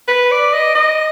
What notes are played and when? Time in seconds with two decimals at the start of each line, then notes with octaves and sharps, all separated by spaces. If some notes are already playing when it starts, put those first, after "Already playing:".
0.08 B4
0.31 D5
0.53 D#5
0.75 D#5